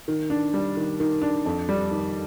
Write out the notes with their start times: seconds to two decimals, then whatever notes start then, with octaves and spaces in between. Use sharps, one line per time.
0.08 D#3
0.30 D4
0.54 G3
0.77 D#3
1.00 D#3
1.22 D4
1.46 F2
1.69 G3
1.91 D#3